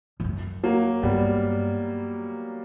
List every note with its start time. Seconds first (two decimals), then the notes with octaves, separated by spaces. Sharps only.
0.20 E2
0.24 F#2
0.64 F#3 A#3
1.03 G2 G3 B3